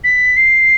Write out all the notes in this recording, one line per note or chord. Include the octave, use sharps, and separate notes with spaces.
B6
C7